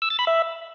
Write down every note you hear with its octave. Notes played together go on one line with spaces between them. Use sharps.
E6
A6
B5
E5